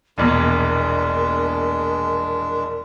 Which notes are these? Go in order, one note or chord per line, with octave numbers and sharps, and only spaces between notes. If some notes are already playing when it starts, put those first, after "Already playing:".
E1 A#1 E2 G#3 D4 A#4